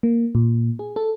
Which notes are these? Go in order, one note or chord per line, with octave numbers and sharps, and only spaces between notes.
A#3
A#2
G#4
A4